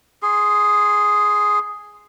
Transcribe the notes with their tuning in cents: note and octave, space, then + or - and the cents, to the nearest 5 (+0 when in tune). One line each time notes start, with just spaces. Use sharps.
G#4 +0 C6 +5